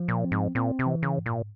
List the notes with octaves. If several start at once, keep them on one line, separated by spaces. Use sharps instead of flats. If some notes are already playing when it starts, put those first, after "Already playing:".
Already playing: F3
A#2
C4
G#2
A#2 C4
C3
E3
C#3
G#2
A#2